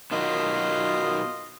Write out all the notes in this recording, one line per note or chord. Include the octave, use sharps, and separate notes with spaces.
B2 D#3 F#3 F4 D#5